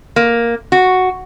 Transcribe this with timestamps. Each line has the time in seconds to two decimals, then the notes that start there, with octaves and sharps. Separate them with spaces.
0.16 A#3
0.72 F#4